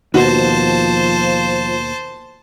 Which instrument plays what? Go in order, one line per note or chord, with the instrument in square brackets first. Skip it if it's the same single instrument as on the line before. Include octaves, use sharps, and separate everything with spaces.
[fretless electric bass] D#2 B2 [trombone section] F3 [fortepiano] F#4 [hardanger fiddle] C5 A5